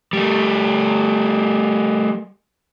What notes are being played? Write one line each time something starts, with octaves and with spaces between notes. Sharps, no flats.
G3 A3